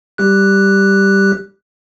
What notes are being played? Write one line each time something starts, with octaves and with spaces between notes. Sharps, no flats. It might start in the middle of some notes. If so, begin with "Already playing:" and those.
G3 G4 F#6